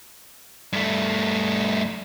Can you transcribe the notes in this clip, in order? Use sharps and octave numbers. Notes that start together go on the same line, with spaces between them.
G2 A3